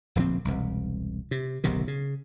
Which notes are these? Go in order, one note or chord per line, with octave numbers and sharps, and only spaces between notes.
D1 A#1 F3 C4
E1 C2
C3
D1 B1 C3 D#3
C#3